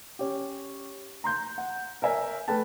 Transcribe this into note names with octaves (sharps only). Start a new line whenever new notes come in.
C#4 G4
A#5 C6 G6
F#5
A#4 C#5 E5 G#5
A3 B4 G5 A5